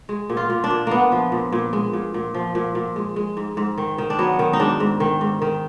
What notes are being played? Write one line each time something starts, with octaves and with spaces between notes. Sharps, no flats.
G#3
A#2
F4
A#2
D4
A#2
A#2 A#3 B3
F3
A#2
A#2
G#3
A#2
A#2
F3
A#2
A#2
G#3
G#3
G#2
G#2
D#3
D#3
D4
F#3 B3
D#3
D#4
G#2 D4
G#2
D#3
G#2
D#3